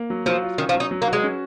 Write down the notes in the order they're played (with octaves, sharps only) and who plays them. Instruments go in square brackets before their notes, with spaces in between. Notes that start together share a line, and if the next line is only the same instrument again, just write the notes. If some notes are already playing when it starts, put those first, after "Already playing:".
Already playing: [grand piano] A#3
F#3
[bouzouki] F3 [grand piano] F#3
[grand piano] F4
[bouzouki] D#3 [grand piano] C#4
[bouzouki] F3
[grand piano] F#3
[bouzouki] D#4
[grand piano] F#3
[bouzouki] A#3
[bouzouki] G#3 [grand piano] F#4
[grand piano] C#4